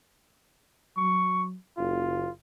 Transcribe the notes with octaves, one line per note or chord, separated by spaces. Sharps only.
F#3 C#6
F#1 F4